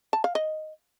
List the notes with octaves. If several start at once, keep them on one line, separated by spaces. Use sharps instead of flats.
A5
F5
D#5